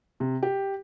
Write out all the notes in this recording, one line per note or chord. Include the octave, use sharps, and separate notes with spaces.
C3
G4